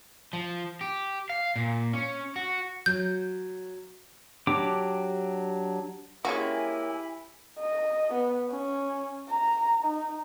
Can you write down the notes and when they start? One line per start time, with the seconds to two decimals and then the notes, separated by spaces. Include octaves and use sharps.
0.33 F3
0.81 G4
1.29 F5
1.56 A#2
1.93 C#4
2.36 F#4
2.86 F#3 G6
4.47 F#3 D4 G4 D6
6.25 G#3 A#3 C#4 E4 F#4 G4 G#5
7.59 D#5
8.13 B3
8.50 C#4
9.29 A#5
9.85 D#4